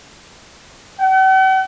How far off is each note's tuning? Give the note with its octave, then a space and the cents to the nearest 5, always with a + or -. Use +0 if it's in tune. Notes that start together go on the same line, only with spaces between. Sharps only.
F#5 +45